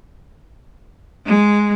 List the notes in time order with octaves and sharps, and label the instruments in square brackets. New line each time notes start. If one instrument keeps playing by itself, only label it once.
[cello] G#3